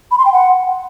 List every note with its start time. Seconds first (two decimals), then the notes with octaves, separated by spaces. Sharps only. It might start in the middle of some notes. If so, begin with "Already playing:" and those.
0.11 B5
0.18 C6
0.25 G5
0.33 F#5